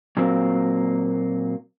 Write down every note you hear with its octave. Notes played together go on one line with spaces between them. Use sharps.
A#2 F#3 A#3 C4